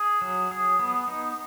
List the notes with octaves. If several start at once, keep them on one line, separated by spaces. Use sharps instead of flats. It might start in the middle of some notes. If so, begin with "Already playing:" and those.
Already playing: G#4
F#3
G#4
B3
D#4